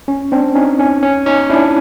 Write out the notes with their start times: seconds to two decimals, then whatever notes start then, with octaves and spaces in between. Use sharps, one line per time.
0.08 C#4
0.32 C4 D4
0.55 C#4 D#4
0.80 C#4
1.03 C#4
1.26 C#4 D#4
1.50 D4 E4